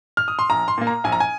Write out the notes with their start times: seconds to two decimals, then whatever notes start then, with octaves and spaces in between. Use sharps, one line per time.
0.17 F6
0.28 D#6
0.39 C6
0.50 A#1 A#5
0.68 C6
0.78 A#2 A#3
0.87 A#5
1.04 A#1 G#5
1.12 A#5
1.20 G#5